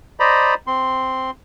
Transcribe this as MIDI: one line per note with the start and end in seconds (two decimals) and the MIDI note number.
0.20 0.54 72
0.20 0.54 74
0.20 0.54 75
0.20 0.54 82
0.20 0.54 83
0.67 1.30 60
0.67 1.30 84